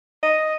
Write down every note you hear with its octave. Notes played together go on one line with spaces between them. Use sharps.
D#5